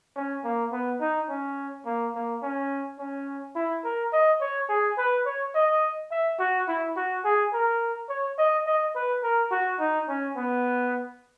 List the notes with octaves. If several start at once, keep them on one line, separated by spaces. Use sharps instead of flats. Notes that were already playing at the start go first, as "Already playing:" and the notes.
C#4
A#3
B3
D#4
C#4
A#3
A#3
C#4
C#4
E4
A#4
D#5
C#5
G#4
B4
C#5
D#5
E5
F#4
E4
F#4
G#4
A#4
C#5
D#5
D#5
B4
A#4
F#4
D#4
C#4
B3